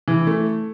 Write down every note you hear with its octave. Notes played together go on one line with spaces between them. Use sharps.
E3
A3